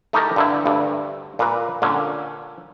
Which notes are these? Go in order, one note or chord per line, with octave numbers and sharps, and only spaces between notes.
A3 D#4 E4 G4 A4 A#4
G2 D3 E4
D2 G2
A#2 A#4 B4
A#2 D3 C#4